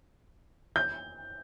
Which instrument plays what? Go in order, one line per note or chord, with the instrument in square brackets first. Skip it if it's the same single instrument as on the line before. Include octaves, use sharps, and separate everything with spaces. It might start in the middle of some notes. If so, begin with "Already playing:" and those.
[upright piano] G6